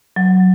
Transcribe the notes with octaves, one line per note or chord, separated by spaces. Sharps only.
F#3